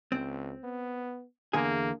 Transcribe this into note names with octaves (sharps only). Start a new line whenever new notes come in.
C#2 C4
B3
E2 D3 A#3 G#4